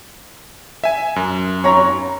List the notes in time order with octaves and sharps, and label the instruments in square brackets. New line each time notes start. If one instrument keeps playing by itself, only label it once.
[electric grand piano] E5 G#5
F#2
[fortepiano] C#5 A#5